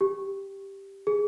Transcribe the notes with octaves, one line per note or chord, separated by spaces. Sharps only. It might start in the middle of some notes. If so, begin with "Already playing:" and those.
G4
G#4